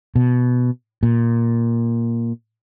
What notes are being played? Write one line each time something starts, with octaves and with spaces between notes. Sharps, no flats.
B2
A#2